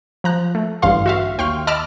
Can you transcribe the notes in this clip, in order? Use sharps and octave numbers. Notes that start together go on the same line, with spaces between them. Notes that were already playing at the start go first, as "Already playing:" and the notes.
F3 A#5 F#6
A3
A1 G2 D3 F5 C6
F#4 E5 F5
D#2 G5 C6 C#6 F6
D#5 A5 B5 D6 E6 F6